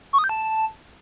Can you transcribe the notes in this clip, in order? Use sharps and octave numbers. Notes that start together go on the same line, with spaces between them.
C#6
D#6
G6
A5